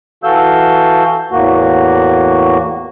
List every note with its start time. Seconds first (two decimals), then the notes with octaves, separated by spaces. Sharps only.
0.24 E3 F#4 A4 F5 E6 G6
1.31 E2 A2 A#3 F#4